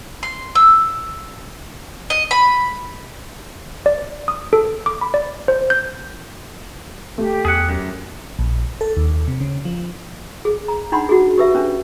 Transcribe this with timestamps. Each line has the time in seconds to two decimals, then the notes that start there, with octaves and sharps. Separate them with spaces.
0.23 C6
0.55 E6
2.10 D#5
2.31 B5
3.86 D5
4.28 D#6
4.53 A4
4.86 D6
5.01 B5
5.14 D5
5.48 C5
5.70 G6
7.18 A3 G4
7.45 E2 G#4 F#5
7.69 F#2
8.39 A#1
8.81 A4
8.97 D#2
9.28 C3
9.40 C#3
9.65 F3
10.45 G#4
10.68 A#5
10.92 D4 D#4 F#5 B5 C6
11.09 F#4 G#4
11.38 G4 B4 E5
11.55 C#4 D4